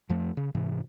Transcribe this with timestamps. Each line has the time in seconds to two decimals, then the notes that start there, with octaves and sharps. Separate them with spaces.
0.09 F2 F3 A3
0.37 C#3
0.55 G#2 C3 E3